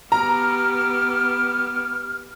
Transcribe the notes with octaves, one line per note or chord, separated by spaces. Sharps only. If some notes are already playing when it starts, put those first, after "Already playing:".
B3 G4 A#5 F6